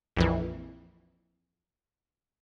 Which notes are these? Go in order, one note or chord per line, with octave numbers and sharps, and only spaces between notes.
A#1 F2 E3